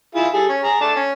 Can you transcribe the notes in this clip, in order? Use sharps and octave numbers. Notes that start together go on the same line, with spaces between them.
E4 F4 G#4
G3 G#4 A4
C#4
G#4 A#5
A3 D4 A5
C#4